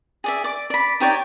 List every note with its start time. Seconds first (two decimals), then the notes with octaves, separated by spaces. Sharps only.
0.24 G#4 D5 E5
0.44 D5 D6
0.70 D5 B5
1.00 D#4 G4 C#5 D5